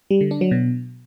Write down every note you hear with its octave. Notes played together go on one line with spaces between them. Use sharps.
G3
D3
D4
F#3
B2